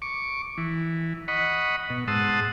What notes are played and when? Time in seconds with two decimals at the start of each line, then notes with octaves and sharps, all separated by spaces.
0.02 C#6 D6
0.58 E3
1.28 D#5 F#5 B5 C#6
1.90 B2
2.08 G#2 F#5 A5 C6 D#6 E6